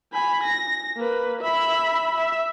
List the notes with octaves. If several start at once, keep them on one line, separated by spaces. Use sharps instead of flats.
G#5 B5
A#6
A#3 B4
E5 B5
E5